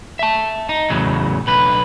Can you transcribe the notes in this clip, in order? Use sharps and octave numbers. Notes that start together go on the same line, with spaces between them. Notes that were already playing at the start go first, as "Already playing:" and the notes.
E5 A5
D#4
E2 A2 C#3 F#3
B1 D3 B4